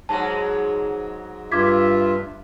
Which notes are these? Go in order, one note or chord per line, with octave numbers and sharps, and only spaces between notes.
G#2 F#3 G#3 A5
G2 F4 E5 D6 G#6 B6